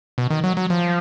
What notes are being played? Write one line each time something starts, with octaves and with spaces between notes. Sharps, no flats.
B2
D#3
F#3
F#3
F3